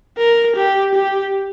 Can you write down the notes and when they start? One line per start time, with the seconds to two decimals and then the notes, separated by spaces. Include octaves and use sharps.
0.17 A#4
0.56 G4
0.95 G4